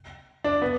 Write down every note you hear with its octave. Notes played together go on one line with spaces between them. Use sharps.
D4
B3